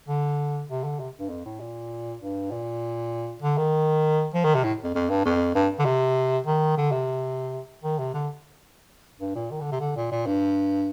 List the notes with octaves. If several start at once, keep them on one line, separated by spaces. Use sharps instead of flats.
D3
C3
D3
C3
G2
F2
A2
A#2
G2
A#2
D3
D#3
F3
D#3
C3
A2
F2
F2
G2
F2
G2
D3
C3
D#3
D3
C3
D#3
C3
D3
G2
A#2
D#3
D3
C3
D3
A#2
A#2
G2